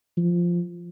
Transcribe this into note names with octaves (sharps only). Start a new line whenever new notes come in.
F3